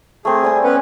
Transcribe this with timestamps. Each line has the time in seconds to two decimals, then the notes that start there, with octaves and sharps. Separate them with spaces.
0.25 A3 C4 G#4
0.43 G3 C4 G#5
0.64 B3 C#4 B4